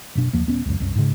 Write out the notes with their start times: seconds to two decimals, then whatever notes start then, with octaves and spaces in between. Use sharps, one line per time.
0.15 F#1 B2 D4
0.33 F#1 D#2 F3 A#3
0.47 D#1 B3 C#4
0.65 C#2 F#2
0.80 C2 F#2
0.95 G#2 C#3